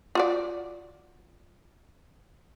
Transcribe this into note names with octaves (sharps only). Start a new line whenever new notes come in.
F4 F#4 D5